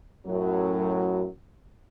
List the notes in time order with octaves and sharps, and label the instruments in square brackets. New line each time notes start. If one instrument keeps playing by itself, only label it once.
[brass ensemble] F#2 A2 F#3